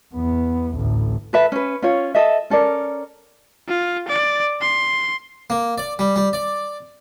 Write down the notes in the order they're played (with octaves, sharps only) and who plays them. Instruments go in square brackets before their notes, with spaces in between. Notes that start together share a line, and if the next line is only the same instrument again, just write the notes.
[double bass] E2 B3
A1 D2
[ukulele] A4 B4 E5
C#4 B4
C#4 F4 C#5
A4 D#5 E5
C#4 A4 A#4 D5
[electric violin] F4
D5
C6
[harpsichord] A#3
D5
G3
G3
D5